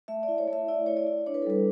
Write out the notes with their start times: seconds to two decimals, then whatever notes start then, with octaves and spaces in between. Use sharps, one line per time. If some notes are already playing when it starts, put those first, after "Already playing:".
0.08 A3 E5
0.23 D5
0.28 E4
0.38 C#5
0.47 A3
0.53 E5
0.68 E4 D5
0.86 E4 C#5
0.97 D5
1.07 E4
1.26 D4 C#5
1.34 B4
1.42 A4
1.47 G3 B4